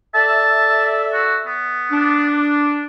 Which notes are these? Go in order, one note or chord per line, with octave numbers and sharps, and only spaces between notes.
A4 D5 E5 A5
F#4
B3
D4